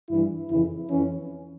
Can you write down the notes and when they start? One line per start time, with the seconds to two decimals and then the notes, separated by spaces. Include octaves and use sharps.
0.09 G2 E3 E4
0.49 F2 C#3 E3 E4
0.89 F2 E3 C#4